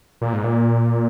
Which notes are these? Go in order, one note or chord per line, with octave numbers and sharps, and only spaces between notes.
A#2
G#2
A#2